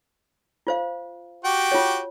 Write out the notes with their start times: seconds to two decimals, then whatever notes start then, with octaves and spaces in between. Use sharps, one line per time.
0.67 F4 C5 F5
1.45 F#4 G4 G5
1.72 F4 C#5